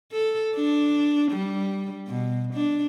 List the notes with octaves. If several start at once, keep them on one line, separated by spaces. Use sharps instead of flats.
A4
D4
G3
B2
D4